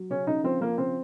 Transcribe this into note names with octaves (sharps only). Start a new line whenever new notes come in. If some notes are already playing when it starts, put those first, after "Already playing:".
Already playing: F#3
C#3 C#4
C#3 D#4
F3 C4
F3 A#3
C#3 C4